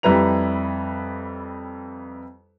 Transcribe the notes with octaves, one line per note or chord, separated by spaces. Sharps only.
F2 G3 E4 B4 A#5 F7